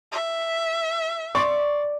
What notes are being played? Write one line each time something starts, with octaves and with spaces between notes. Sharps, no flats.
E5
D5 C6 C#6